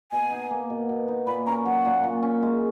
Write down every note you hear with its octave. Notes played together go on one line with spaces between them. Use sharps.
B2 G#5
D#4
A#3
B2
B2
D#4
A#2 B5
C#4 A#5
F#3 F#5
A#2
A#2
C#4
G#3